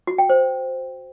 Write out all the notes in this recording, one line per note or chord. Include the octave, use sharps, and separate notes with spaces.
F#4
G5
C5